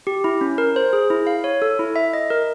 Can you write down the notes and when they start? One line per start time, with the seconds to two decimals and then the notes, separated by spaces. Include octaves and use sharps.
0.07 G4
0.24 E4
0.41 C#4
0.58 A#4
0.76 C5
0.93 G#4
1.10 E4
1.27 F5
1.44 C#5
1.62 A4
1.79 E4
1.96 E5
2.13 D#5
2.30 A#4